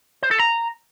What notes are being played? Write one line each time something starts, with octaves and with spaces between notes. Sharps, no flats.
C5
A4
A#5